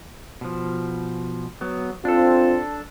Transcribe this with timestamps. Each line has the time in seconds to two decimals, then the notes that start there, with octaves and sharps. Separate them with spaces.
0.41 B2 F3
1.61 F#3 B3
2.05 C4 D4 F4 A4